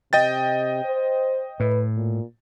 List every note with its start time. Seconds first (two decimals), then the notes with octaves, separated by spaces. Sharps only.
0.13 C3 D#5 G5 A6
0.85 C5
1.60 A2 B4
1.96 A#2